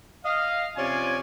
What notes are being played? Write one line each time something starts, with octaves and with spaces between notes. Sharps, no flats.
D#5 F5
C3 F3 C#4 F4 D5 G#5